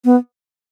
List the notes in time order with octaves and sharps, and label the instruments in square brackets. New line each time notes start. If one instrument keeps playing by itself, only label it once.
[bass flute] B3